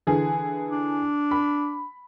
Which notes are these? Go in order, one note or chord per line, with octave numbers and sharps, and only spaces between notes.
D3 E3 G#4
D4
B5